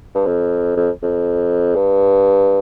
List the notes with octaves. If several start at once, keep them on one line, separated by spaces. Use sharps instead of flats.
G2
F2
F2
F2
G2